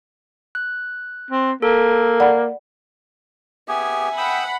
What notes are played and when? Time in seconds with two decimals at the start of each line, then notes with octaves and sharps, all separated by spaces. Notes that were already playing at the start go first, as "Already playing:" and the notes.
0.55 F#6
1.31 C4
1.62 A#3 A4
2.20 D5 F#5 B5
3.68 B3 G4 G#4 E5 G#5
4.18 F#5 G5 B5 D#6 E6